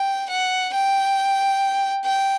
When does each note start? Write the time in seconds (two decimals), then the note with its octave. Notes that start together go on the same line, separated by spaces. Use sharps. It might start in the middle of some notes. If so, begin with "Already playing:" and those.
Already playing: G5
0.30 F#5
0.74 G5
2.05 G5